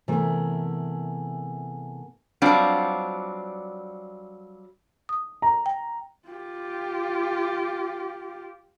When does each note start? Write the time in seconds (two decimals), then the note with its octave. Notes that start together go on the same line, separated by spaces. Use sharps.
0.08 C3 E3 A3 B3 G#4 A#4
2.42 F#3 G3 C4 D4 F4
5.09 D#6
5.42 A#5
5.66 G5
6.28 F4 G4